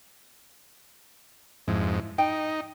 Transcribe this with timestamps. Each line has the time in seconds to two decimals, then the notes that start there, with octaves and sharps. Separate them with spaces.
1.68 F2 G#2 E4
2.18 D#4 G5